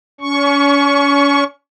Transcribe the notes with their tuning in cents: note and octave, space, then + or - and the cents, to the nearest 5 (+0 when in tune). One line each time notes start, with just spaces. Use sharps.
C#4 +35 C#6 +0